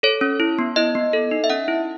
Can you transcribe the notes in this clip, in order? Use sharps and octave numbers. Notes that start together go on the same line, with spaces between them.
A4 C#5
C#4
E4
B3
E4 D#5
B3
A4
D#4
E5
C#4 F#5
E4